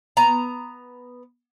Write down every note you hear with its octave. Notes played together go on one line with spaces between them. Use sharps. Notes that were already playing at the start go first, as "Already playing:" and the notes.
B3 A#5